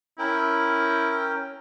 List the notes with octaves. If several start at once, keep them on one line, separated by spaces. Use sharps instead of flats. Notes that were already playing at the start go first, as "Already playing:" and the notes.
C#4 E4 A#4 G5